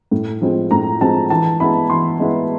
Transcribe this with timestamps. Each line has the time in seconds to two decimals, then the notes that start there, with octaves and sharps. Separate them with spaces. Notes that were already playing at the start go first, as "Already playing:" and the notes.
0.11 A2
0.41 F3 G#3 C4
0.71 A2 A#5
1.01 F3 G#3 C4 A5
1.30 E3 A5
1.60 G#3 B3 E4 B5
1.90 E3 C6
2.19 G#3 B3 E4